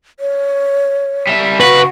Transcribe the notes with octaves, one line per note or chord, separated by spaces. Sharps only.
C#5
G3 E5
C#3 F#4 B4 C#6